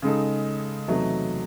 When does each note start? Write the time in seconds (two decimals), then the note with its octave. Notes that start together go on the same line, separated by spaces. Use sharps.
0.02 C#3 G#3 D#4 A4
0.87 E2 C3 F#3 A3 D#4